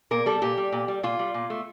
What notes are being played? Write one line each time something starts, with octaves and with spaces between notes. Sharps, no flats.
A#2 A#4
G3 A4
A#2 G4
G3
A#2
G3
A#2 F4
G3
A#2
A3